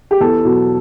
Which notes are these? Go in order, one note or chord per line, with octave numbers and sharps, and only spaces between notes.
G4
E2 A4
B2 F#3